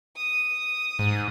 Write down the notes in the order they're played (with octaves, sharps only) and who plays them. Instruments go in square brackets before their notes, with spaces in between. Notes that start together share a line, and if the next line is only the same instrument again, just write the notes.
[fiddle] D#6
[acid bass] G#2